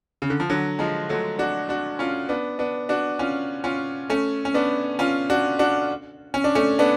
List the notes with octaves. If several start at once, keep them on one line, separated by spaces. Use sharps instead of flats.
C#3
D3
F3
D3 F#3
F3 G#3
F#3 A3
D4 F#4
D4 F#4
C#4 F4
B3 D4
B3 D4
D4 F#4
C#4 F4
C#4 F4
A3 C#4
C#4
B3 D4
C#4 F4
D4 F#4
D4 F#4
C#4
D4
A3 C#4
B3 D4